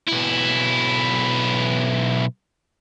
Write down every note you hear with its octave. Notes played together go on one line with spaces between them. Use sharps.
B1 E4